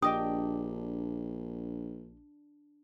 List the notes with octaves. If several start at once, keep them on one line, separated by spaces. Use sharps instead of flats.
A#1 D4 G4 D#5 G5 D#6